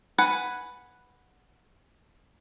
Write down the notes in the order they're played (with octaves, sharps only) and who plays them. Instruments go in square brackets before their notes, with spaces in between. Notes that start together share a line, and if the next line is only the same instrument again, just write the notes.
[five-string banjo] B4 F#5 G#5